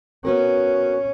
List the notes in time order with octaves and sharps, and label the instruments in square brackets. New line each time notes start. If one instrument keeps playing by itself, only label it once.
[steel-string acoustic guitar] B3 F#4 A#4 [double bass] C#4